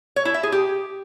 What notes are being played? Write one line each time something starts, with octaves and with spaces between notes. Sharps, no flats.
C#5
E4
E5
G#4
G4